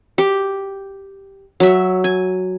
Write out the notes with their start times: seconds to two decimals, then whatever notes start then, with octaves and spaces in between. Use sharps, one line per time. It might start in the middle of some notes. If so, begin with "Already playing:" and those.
0.18 G4
1.60 F#3 E5
2.04 G#5